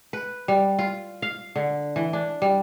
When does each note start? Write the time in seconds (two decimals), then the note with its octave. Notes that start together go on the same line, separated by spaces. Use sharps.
0.13 B4
0.48 G3
0.79 F4
1.22 F5
1.56 D3
1.96 E3
2.13 D4
2.42 G3